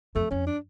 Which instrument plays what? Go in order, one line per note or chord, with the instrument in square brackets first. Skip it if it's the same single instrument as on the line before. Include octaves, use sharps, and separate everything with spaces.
[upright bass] F2 [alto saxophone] A3
[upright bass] F2 [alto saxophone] C#4
[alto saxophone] D4